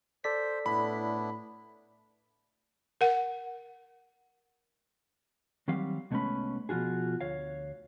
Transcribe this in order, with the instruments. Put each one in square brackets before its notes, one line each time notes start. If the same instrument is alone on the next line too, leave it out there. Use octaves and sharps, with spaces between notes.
[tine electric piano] A4 D5 B6 [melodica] C5
[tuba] A2 [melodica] B3 D4 E4 [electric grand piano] B5
[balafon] A#4 F#5
[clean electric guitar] D#3 F#3 G3 C4 F5
C2 G#3 A3 B3 C#4 B5
B2 F3 F4 F#4 G#4
D2 C#5 F5